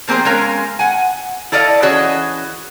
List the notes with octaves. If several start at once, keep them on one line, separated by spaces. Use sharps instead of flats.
F3 A#3 C4 G#4 C5
G#3 C#4 A#4 F5
F#5 G#5
E4 A4 D5 D#5 F5
E3 C#4 F#4 G#4 C#5 D#5